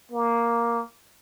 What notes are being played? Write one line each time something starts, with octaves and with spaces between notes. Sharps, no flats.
A#3